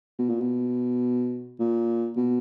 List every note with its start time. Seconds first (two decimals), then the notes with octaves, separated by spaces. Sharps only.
0.19 B2
0.29 A#2
0.41 B2
1.60 A#2
2.16 B2